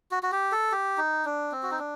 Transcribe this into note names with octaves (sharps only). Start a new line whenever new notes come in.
F#4
F#4
G4
A4
G4
D#4
D4
C4
F#4
D#4
D4